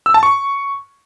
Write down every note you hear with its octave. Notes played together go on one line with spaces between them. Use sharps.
E6
A5
C#6